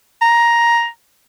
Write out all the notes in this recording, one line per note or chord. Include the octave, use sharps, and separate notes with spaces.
A#5